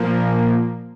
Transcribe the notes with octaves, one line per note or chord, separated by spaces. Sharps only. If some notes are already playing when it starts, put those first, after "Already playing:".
Already playing: A#2 F3 A#3